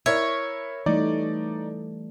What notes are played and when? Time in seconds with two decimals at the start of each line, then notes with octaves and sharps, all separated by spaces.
0.06 E4 A#4 C#5 E5
0.86 E3 G3 A3 D#4 D5